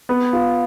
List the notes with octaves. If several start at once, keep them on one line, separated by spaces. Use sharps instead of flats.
B3
F4